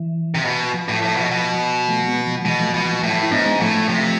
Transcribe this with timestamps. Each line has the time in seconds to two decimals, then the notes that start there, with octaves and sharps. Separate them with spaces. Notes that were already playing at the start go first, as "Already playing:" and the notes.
Already playing: E3
0.35 C3
0.45 B2
0.74 F3
0.89 A2
1.02 A2
1.16 B2
1.31 B2
1.88 F3 A3
2.07 G#3 B3
2.27 F3
2.45 B2 E3 G#3
2.60 F3 A3
2.74 B2 F3
2.89 F3
3.03 A2 F3
3.23 E4
3.31 G#2 B3 D4
3.46 G#3 B3
3.60 A2 F3 A3
3.89 C3